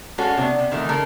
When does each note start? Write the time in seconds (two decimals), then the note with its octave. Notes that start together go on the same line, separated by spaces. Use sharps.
0.18 G#3 C#4 F4 F#4 A4 C#5
0.37 C3 B3 D4
0.59 C3
0.71 C3 D#3 E3 A3
0.89 C#3 G#3 A4 A#4